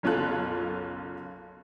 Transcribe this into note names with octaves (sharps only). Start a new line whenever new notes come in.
F#1 B1 C#4 F4 A4 F#6